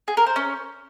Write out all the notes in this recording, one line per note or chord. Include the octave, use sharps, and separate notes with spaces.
G#4
A#4
C5
C#4